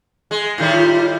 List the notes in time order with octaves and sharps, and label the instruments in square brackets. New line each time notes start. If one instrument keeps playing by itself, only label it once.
[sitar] G#3
A2 D#3 G3
[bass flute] F4